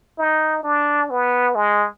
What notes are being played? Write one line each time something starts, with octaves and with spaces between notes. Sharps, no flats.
D#4
D4
B3
G#3